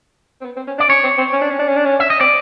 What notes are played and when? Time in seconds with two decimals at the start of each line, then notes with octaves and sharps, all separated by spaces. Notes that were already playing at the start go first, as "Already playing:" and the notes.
0.41 C4
0.45 B3
0.56 C4
0.67 C#4
0.78 D4 D5
0.88 C#4 C#5
1.03 C4
1.18 C4
1.33 C#4
1.41 D4
1.50 C#4
1.59 D4
1.68 C#4
1.77 D4
1.85 C#4
2.00 E5
2.10 D#5
2.20 C4 D5